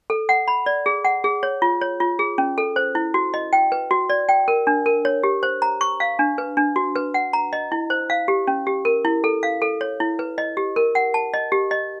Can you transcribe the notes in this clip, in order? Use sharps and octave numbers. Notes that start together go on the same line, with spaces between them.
A4
F#5
B5
D5
G#4
F#5
G#4
C#5
F4
C#5
F4
G#4
C#4
A4
C5
E4
F#4
D#5
G5
B4
F#4
D5
G5
A#4
D4
A#4
C#5
G4
C5
A#5
C#6
F5
D4
B4
D4
F#4
B4
F#5
A#5
D#5
E4
C5
F5
G4
C#4
G4
A#4
E4
A4
F5
A4
C#5
E4
B4
D#5
G4
A#4
F#5
A5
D#5
G4
D#5